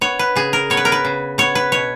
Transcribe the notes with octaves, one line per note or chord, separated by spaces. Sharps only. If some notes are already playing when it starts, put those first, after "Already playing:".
B3 C#5
B4
C#3 G#4
A#4
B3 C#5
B4
A#4
B4
C#3
B3 C#5
B4
B2 C#5